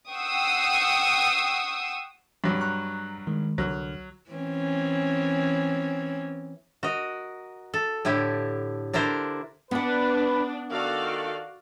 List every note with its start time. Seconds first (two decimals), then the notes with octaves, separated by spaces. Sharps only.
0.11 F#5 G5 C#6 D#6 E6 C7
2.44 G2 F#3
2.61 A#5 C#6 F#6
3.27 D#3 G#3
3.58 C2 D3 F#3 F6
4.30 E3 C4 C#4
6.83 F#4 A#4 D#5
7.74 A4
8.05 A2 D3 E4 G4
8.93 D3 D4 E4 A#4 C5
9.71 B3 D4 B4 F#5
10.70 D#3 F#4 A4 D5 F5